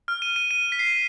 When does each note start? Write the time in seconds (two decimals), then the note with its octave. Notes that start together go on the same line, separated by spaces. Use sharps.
0.08 F6
0.22 D#7
0.36 D#7
0.51 D#7
0.72 B6
0.79 C7